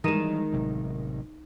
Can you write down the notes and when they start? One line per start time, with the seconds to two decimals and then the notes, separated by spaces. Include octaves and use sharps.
0.04 D#3 E3 G3 G#3 D#4 D#7 E7
0.52 A1 C3 F#3